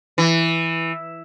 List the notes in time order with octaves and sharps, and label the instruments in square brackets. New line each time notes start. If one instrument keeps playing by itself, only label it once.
[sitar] E3